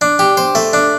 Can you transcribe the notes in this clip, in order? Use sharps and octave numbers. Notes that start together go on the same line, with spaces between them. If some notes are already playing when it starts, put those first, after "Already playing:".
D4
G4
C5
A3
D4